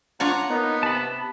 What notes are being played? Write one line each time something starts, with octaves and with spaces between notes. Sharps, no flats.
D4 F4 C#5 F#5 A#5 F#6
A#3 B3 D#4
C3 A5 B5